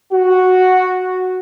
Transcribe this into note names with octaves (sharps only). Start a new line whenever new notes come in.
F#4